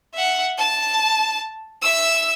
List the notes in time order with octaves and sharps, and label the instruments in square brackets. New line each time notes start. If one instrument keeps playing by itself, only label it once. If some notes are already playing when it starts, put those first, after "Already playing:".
[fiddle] E5 F#5
A5
E5 E6